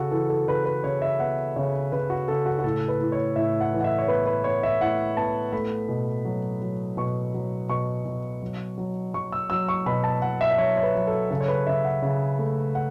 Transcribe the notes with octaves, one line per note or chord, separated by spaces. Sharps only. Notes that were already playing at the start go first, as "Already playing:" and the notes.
Already playing: C#3 F#4 A4
E3 A4
A4
C#3 B4
B4
C#3 C#5
E5
B3 F#5
C#3 C#5
C#3 B4
F#4
C#3 A4
F#4
F#4
A2 A4
B4
A2
C#5
A2 E5
F#5
E3
F#5
E5
C#5
B3 B4
B4
B3 C#5
E5
A2 F#5
B3 A5
A3 B5
B2
F#3
F#3
B2 C#6
F#3
B2 C#6
B2
F#3
F#3
F#3 C#6
E6
F#3 E6
C#6
B2 B5
A5
B2 F#5
E5
E5
F#3 C#5
C#5
B4
F#3
A4
C#3 A4
C#5
B4
C#3 E5
F#5
C#3
A3
F#5